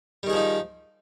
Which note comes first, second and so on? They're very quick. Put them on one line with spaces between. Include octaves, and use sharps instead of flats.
G3 D#3 G#4 F3 D#4